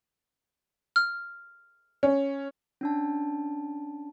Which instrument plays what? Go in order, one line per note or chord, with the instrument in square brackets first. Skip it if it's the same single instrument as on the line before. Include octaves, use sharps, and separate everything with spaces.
[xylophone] F6
[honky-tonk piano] C#4
[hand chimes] C#4 D4 A5